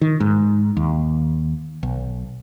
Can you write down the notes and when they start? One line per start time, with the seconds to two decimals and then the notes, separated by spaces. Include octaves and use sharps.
0.01 D#3
0.20 G#2
0.77 D#2
1.83 B1